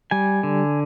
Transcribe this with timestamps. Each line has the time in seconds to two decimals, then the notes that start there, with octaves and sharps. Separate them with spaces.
0.11 G3 G#5
0.43 D3